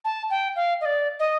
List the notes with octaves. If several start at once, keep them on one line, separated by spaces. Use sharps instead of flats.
A5
G5
F5
D#5
D5
D#5